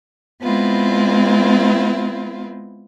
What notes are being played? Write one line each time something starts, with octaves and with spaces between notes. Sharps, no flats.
G#3 B3 C4 E4 F4